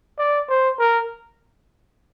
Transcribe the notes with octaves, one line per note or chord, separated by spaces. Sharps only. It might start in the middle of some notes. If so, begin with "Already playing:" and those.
D5
C5
A#4